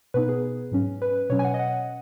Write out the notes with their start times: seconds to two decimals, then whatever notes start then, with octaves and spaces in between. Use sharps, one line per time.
0.14 B2 B3 D#4 B4
0.29 G#4
0.71 G#2 F#3 C#4
1.02 B4
1.30 B2 F#3 C#4 C#5
1.39 G#5
1.44 F#5
1.54 D#5
1.59 F#5